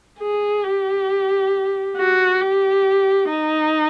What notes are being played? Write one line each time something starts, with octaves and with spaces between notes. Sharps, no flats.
G#4
G4
F#4
G4
D#4